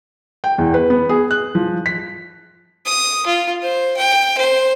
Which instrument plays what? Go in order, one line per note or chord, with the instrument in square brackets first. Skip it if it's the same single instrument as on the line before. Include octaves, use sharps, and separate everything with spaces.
[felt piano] G5
E2
B4
B3
G#4
F#6
F3
B6
[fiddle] D#6
F4
C5
G5
C5